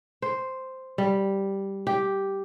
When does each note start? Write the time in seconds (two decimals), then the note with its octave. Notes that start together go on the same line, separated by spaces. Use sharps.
0.22 C5
0.98 G3
1.87 G4